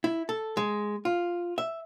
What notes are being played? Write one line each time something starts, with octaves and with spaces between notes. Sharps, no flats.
E4
A4
G#3
F4
E5